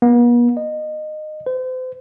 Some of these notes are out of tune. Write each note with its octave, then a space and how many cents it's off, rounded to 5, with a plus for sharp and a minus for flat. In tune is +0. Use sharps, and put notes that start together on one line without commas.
B3 -45
D#5 -20
C5 -35